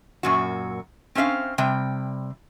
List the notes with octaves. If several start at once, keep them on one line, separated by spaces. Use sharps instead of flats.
F#2 A#2 F#4
C4 C#4 C5 E5 F5
C3 G3 G5